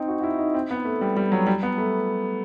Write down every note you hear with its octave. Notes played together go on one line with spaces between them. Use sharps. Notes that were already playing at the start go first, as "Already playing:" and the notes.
Already playing: C4 D#4
F#4
F#4
E4
D#4
C4
B3
A3
G3
G3
F#3
G3
B3
A3